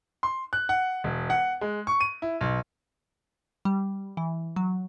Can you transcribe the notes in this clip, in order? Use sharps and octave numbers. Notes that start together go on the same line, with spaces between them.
C6
F#6
F#5
E1
F#5
G#3
C#6
D#7
E4
B1
G3
E3
F#3